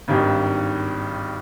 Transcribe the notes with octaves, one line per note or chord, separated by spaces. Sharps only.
G#1 G2 D#3